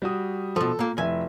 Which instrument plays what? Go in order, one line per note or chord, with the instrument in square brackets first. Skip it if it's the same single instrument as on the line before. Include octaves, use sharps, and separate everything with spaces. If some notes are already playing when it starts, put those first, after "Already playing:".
[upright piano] G3 F#4 D#6
[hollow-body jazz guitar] B2 F3 [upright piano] A4
[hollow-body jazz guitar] A#2 A#3
[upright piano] F1 E4 E5 [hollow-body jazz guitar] G#5